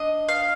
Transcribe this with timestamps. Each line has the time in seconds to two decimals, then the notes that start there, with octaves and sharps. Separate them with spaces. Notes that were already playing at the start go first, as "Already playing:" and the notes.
Already playing: D4 D#5
0.29 F5